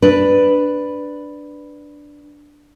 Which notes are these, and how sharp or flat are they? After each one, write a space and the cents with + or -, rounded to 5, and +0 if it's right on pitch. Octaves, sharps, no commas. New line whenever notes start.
D4 +0 B4 +0